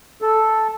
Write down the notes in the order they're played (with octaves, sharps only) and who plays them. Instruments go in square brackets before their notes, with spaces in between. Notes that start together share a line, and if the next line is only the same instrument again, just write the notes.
[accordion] A4